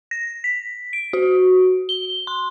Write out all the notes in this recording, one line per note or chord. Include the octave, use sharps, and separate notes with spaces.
A#6
B6
D7
F#4
G7
C6